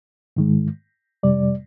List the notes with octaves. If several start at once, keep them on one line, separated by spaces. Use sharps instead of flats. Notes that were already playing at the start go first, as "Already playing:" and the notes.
G#2 D#3 G#3
F2 C3 G3 D5